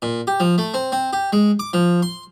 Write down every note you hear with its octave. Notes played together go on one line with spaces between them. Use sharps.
A#2
G4
F3
A3
C4
C4
G4
G#3
D6
F3
C6